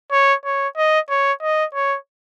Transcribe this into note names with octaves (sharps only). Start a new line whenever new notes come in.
C#5
C#5
D#5
C#5
D#5
C#5